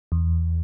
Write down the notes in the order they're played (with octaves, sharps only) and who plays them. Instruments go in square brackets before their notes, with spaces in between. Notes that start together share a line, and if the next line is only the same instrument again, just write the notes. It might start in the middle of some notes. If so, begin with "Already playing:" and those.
[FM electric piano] E2